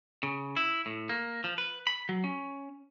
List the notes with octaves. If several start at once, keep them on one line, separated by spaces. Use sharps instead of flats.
C#3
E4
A2
A#3
F3
B4
B5
F#3
C#4